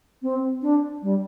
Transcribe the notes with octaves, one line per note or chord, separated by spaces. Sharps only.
C4
D4
G3